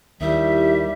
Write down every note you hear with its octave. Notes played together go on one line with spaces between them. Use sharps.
D#2 G3 D#4 E4 G4 E5